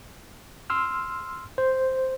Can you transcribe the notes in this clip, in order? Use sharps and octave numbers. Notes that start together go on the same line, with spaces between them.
C6 E6 F6
C5